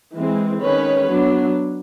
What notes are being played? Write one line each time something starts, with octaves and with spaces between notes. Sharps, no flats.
E3 G#3 C4
D#3 G#3 C#4 B4 C#5
F#3 B3 D4